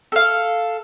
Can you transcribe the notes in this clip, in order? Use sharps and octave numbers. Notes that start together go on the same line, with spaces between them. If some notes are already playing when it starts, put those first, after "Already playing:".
A4 F5